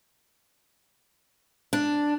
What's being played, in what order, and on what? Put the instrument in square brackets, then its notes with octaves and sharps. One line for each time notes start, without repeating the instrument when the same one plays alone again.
[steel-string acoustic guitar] D4